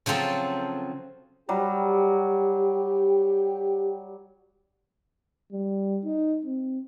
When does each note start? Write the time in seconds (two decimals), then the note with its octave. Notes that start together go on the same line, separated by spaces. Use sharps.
0.06 C#3 F3 F#3 C4 A4
1.49 F#3 G3 G4
5.52 G3
6.05 D#4
6.45 C4